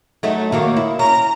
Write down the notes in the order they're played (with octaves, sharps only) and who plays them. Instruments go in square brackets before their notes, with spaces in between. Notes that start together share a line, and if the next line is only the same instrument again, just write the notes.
[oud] F#3 A3 D#4
D#3 F#3 A#3
E4
[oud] C#4 [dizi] A#5